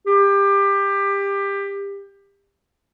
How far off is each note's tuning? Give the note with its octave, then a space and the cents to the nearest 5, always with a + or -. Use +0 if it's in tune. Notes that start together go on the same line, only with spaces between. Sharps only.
G4 +20